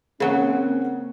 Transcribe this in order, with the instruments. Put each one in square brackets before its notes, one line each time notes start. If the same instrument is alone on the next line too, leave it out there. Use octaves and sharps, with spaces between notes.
[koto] C#3 F#3 [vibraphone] A#3 [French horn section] C4 C#4 [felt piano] G#4 A#4 F#5